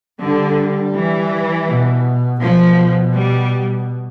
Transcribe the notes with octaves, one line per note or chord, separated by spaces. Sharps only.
D3 G3
E3
B2
B2 F3
G3